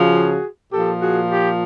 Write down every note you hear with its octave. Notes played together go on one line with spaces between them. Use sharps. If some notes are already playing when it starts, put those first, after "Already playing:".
Already playing: C#3 F3 F#4 G#4
A#2 F3 G4 A4
F#4 G#4
F4 G4